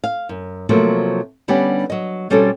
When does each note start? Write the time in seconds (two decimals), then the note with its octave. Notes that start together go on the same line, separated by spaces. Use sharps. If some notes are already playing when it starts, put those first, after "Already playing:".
0.04 F5
0.29 F#2
0.69 C3 F3 F#3 A3 A#3 C4
1.48 D3 G3 B3 C#4 D4 G4
1.90 F#3 D#5
2.30 B2 G3 C4 C#4 F#4 A4